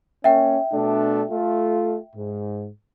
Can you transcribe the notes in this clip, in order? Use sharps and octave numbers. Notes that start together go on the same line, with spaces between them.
A#3 C#4 E5 G5
B2 A3 D4
A3 F4
G#2